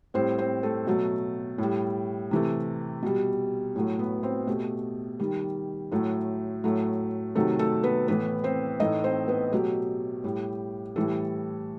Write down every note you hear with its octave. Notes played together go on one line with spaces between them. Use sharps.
A2 G3 C4 C5
C4 C5
A3 A4
B2 F#3 A3
A2 G3
C3 E3 A3
B2 G3
A2 F#3 A3
B3 B4
C4 C5
B2 A3 G4
D#3 G3
A2 F#3 A3
A2 F#3 A3
C3 D#3 F#3 A3 A4
A3 A4
B3 B4
A2 E3 A3 B3 B4
C4 C5
A2 E3 A3 D#4 D#5
C4 C5
B3 B4
B2 F#3 A3 G4
A2 G3
A2 E3 G3 A3 A4